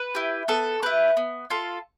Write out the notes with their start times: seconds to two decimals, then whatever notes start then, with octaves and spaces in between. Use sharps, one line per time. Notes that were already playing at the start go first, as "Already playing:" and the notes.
Already playing: B4
0.15 E4 G4
0.48 B3 A4
0.82 E4 G4 B4
1.17 B3
1.50 F4 A4